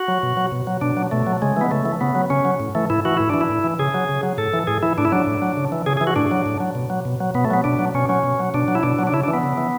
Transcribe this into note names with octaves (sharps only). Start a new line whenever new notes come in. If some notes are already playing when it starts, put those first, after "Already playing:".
Already playing: F#4
F#3
B2
F#3
B2
F#3
B2 D4
F#3
B2 A3
F#3
C#3 G#3
E3 B3
C#3 A3
E3
C#3 B3
F#3
C#3 C#4
F#3
A2
E3 A3
A2 E4
E3 F#4
A2 E4
E3 D4
E4
A2
E3
C#3 G#4
F#3
C#3
F#3
A2 A4
E3
A2 G#4
E3 E4
A2 D4
E4
F#3 D4
A2
F#3
C#3
E3
C#3 G#4
G#4
E3
F#4
A2 D4
F#3
A2
F#3
B2
F#3
B2
F#3
B2 B3
A3
F#3 B3
B2 D4
F#3
B2 C#4
F#3 C#4
B2
F#3
B2 D4
F#3
E4
B2 D4
F#3
D4
C#3 E4
D4
E3
B3
C#3
E3